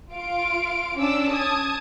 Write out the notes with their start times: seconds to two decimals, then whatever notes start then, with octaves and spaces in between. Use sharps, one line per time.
0.12 F4 F5 D7
0.96 C#4 D4 D6 E6
1.31 A5 D#6 G#6